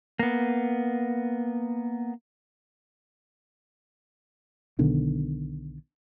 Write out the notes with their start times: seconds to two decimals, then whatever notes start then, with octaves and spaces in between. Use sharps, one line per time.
0.19 A#3 B3
4.79 B1 B2 D3 D#3